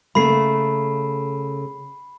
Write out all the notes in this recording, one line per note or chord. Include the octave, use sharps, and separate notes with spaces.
C#3 A3 A#3 B5 C7